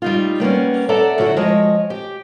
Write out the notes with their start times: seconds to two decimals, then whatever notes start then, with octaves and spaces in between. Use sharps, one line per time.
0.02 G3 D#4 F4
0.40 G3 A#3 B3 C#4
0.89 A4 D5 E5 F#5 A#5
1.18 F#2 D3 E4 F#4
1.36 F3 G#3 C#5 D#5
1.90 G4